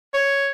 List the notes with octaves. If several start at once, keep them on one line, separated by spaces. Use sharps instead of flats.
C#5